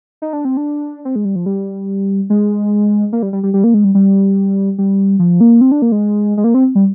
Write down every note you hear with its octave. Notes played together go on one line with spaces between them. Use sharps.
D#4
D4
C4
D4
C4
G#3
G3
F3
G3
G#3
A#3
G3
G3
G3
G3
A#3
G#3
G3
G3
G3
F3
A#3
C4
D4
A#3
G#3
G#3
A#3
C4
G3